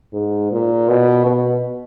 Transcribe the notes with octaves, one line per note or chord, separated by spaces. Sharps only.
G#2
A#2
B2
B2